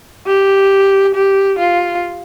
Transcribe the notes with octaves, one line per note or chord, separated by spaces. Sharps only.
G4
G4
F4